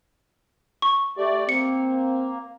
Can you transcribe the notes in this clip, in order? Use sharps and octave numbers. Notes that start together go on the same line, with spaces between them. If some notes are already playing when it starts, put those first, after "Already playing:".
C#6
A3 G4 D5
A#3 C4 C#7